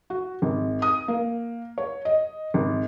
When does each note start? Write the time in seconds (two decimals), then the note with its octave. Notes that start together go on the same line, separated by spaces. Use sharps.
0.10 F#4
0.42 G#1
0.82 D#6
1.08 A#3
1.78 C#5
2.05 D#5
2.54 G#1